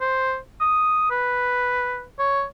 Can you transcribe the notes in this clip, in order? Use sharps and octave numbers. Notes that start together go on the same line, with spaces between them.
C5
D#6
B4
C#5